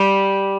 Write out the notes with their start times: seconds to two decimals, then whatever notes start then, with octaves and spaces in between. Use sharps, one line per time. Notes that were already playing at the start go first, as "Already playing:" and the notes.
Already playing: G3